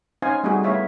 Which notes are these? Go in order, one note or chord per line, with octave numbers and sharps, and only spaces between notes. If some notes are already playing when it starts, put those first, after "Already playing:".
C#4 D#4 C5 F5 G#5
G3 A3 C4 D#4 F#4 G#4
A3 B3 E4 C#5 E5 F5